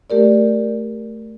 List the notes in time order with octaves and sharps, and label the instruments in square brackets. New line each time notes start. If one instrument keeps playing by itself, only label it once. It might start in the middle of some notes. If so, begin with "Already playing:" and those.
[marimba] A3 G4 A#4 D5